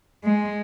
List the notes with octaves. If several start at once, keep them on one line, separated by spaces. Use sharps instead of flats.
G#3